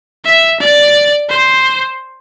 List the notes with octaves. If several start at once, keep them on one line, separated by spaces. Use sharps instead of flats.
E5
D5
C5